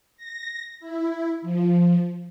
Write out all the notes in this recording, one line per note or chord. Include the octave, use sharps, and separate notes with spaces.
A#6
E4
F3